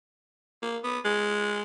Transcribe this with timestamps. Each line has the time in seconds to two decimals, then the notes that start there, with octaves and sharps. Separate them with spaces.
0.62 A#3
0.84 B3
1.05 G#3